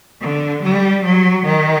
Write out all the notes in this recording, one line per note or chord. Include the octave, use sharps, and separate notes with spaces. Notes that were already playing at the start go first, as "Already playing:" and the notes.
D3
G3
F#3
D#3